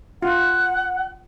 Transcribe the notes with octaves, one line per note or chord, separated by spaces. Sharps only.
F4 F#5